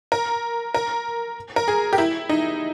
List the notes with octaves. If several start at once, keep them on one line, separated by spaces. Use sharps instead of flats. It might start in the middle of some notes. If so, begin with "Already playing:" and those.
A#4
A#4
A#4
G#4
G4
E4
D#4